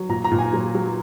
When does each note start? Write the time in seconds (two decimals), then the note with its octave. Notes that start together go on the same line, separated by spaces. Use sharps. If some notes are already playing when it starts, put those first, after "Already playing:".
Already playing: F#3
0.09 A#2 A#5
0.24 A#5
0.31 A#2
0.39 G#5
0.53 F#3
0.75 F#3